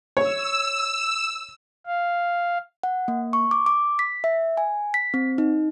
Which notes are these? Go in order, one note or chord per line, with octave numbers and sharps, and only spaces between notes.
C#5 E6
F5
F#5
A#3
C#6
D6
D6
B6
E5
G#5
B6
C4
D#4